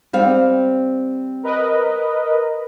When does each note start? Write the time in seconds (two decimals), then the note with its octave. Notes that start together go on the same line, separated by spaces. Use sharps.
0.13 G3 C4 F5
1.43 A#4 B4 D#5